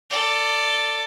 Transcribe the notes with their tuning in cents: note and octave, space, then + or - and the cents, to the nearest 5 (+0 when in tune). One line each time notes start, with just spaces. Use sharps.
A4 +20 D5 +0